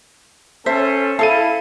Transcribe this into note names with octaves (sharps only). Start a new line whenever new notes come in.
C#4 A4 C5 E5
E4 A4 F5 A5 D#7